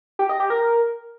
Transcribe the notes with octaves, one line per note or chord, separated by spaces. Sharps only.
G4
D#5
G4
A#4